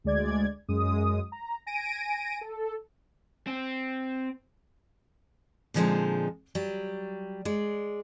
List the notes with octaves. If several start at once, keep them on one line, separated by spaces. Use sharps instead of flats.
D2 G#3 D5 G#6
F#2 G#3 D#6
A#5
G#5 A#6 D7 D#7
A4
C4
A#2 D3 F3 G#3 C4 D#4
F#3 G3
G#3 D5